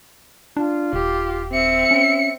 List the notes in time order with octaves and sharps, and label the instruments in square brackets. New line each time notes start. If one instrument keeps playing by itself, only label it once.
[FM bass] D4 [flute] F4
[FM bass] D#1 [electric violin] G4
[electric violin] C4 C#7 [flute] E5
[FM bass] C#4